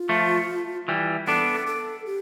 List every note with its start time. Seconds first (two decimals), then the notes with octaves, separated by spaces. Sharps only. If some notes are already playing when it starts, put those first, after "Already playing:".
Already playing: F4
0.09 F3 A3
0.88 E3 G3
1.28 B3 D4 A4
1.67 A4
2.06 G4